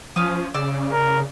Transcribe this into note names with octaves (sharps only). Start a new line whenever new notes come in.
F3 C#4 F5 D#6
C#3 D5 E6
A#4